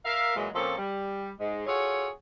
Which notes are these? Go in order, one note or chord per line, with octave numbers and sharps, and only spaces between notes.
A#4 E5 F5
A#2 E3 F#3 G#3
A#2 F3 A#3 C4 C#4 A4
G3
G#2 G#3
F4 F#4 G#4 A4 C#5